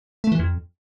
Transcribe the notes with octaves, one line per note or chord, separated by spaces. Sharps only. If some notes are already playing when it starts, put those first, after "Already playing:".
A3
E3
F2